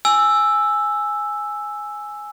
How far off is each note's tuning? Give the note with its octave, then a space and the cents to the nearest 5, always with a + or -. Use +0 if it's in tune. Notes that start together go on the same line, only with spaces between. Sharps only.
G#5 +0 E6 +0